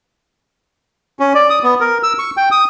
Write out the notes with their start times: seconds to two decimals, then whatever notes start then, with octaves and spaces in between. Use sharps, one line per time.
1.20 C#4
1.35 D5
1.50 D#6
1.63 B3
1.81 A#4
2.03 E6
2.19 C#6
2.37 G5
2.51 D#6